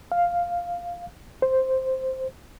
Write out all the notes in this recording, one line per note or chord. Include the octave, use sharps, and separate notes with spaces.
F5
C5